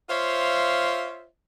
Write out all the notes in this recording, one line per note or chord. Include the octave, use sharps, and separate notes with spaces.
F4 C5 C#5 E5 F5